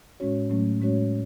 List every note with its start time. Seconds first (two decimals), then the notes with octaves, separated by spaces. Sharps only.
0.20 A2 G#3 C#4 F#4 C#5
0.50 A2 F#3 A3 C#4
0.81 A2 G#3 C#4 F#4 C#5